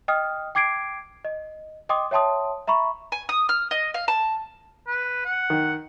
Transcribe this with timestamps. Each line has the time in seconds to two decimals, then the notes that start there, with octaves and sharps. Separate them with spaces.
0.08 D#5 G5 D#6 F6
0.55 G5 D6 G#6 C7 D7
1.25 D#5
1.89 D#5 G5 C6 D6 D#6
2.11 C#5 E5 G5 A5 C6 D#6
2.67 E5 A#5 B5 C#6
3.12 G#5
3.29 D#6
3.49 F6
3.71 D#5
3.94 F5
4.08 A5
4.87 B4
5.25 F#5
5.50 D#3